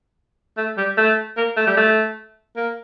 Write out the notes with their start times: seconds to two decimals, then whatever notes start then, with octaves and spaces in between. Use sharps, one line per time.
0.58 A3
0.77 G3
0.97 A3
1.37 A#3
1.57 A3
1.67 G3
1.77 A3
2.56 A#3